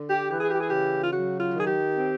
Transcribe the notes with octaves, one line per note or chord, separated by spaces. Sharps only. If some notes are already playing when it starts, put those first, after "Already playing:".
Already playing: D3
G4
E3 G4
G#4
G4
G#4
C#3 G4
F4
F#3 F#4
F4
D#3
G#4
G4
C4